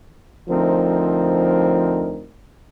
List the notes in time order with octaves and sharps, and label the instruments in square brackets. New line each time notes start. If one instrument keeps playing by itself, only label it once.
[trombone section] D2 F3 C4 D#4 A#4